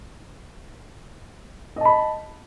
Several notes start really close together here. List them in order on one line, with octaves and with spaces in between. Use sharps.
D#5 A5 B5